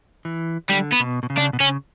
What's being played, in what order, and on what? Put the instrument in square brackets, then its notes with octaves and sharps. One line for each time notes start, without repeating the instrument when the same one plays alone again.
[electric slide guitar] E3
[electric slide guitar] D3 [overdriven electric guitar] G3
[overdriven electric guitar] B3
[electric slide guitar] B2
B2
C#3
[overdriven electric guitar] D4
[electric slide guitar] B2
[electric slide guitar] C#3 [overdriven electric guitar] C#4